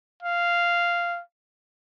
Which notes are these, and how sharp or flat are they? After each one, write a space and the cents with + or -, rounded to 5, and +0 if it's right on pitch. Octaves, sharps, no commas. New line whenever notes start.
F5 -10